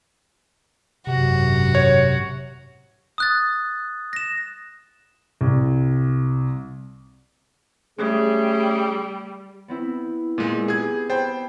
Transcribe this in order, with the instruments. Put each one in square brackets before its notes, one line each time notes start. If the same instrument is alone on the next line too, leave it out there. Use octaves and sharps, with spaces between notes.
[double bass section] G#1 F#2 [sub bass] C3 [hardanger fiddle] F#4
[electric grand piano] C#5
[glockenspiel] D#6 F#6 A6
A#6 E7
[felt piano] C2
[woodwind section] C#3 A3 G#4 [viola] G3
[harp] B3 C4 E4
[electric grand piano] A#2 G#3 [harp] D#7 E7
[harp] B3 G4 E6 [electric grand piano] G#4 G#6
[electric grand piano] C5 G5 [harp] A5 B5 A6